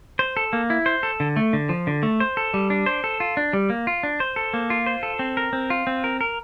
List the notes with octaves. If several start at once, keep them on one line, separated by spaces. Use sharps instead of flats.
C5
A4
A#3
E4
C5
A4
D3
A3
D3
F3
D3
A3
C5
A4
G3
D4
C5
A4
F4
D4
G3
A#3
F4
D4
C5
A4
A#3
F4
C5
A4
C4
A#4
C4
F4
C4
A#4
A#4